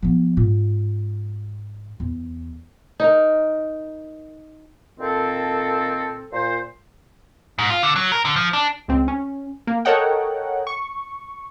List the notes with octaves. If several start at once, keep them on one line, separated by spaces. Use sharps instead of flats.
F3 B3
G#2 F4
E2
D#4 A#4
A#2 D#3 C4 A4
A#2 C5
G#2
F4
D3
F#3
A#4
D3
F3
D4
C#2 C4
C#4
A#3
A4 A#4 C#5 D#5 F#5 G5
C#6